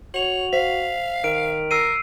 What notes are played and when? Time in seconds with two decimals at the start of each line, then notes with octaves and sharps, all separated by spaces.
0.14 F#4 C#5 F7 F#7
0.53 C5 F5 B6
1.24 D#3 F6 D7
1.71 A#4 E6 C7 D#7